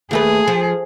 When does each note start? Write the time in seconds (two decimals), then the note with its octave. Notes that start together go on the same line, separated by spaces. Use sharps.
0.11 D#2 A3 G#4 B4
0.47 F3